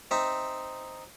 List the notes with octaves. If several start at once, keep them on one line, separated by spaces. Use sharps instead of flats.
C4 D#4 E5